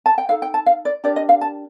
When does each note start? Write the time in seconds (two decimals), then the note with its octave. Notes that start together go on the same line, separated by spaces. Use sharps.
0.06 A5
0.18 G5
0.29 D#4 A4 F5
0.42 G5
0.54 A5
0.66 F5
0.85 D5
1.04 D4 G4 A#4 D5
1.16 D#5
1.29 F5
1.41 A5